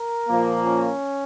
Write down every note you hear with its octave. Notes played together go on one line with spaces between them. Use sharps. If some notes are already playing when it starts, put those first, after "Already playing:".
Already playing: A#4
A#2 F3 A#3
C#4